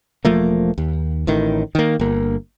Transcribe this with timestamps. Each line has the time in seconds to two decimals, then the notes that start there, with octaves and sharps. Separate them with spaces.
0.25 E1 F3 A3 A#3
0.78 D#2
1.27 A1 A2 D#3
1.75 D#3 A#3
2.00 G1 A#3